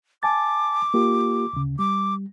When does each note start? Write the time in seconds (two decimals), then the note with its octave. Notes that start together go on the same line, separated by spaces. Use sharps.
0.23 G#5 A5 D6 A6
0.94 A#3 F4 G4
1.53 D2 C#3
1.79 G3 D6